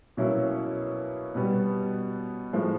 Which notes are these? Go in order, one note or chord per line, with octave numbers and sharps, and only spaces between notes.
B2 F#3 A#3 C#4 E4
B2 G3 B3
A2 F3 G#3